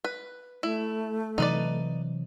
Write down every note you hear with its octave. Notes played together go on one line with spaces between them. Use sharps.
B4
A3 E4
C3 E3 F#3 D#4 B4 D5